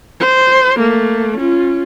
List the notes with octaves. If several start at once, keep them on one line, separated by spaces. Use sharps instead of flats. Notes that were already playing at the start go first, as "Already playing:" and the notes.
C5
A3 A#3
C#4 F4